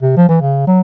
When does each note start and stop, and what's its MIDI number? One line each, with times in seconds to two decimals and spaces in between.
0.03 0.13 48
0.17 0.25 53
0.29 0.40 52
0.41 0.64 49
0.67 0.81 54